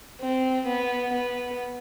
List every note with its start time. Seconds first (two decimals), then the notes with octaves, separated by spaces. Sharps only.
0.21 C4
0.67 B3
1.13 B3